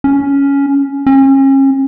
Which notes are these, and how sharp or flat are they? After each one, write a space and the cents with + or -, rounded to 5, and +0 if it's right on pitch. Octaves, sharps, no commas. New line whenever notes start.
C#4 +10
C#4 -35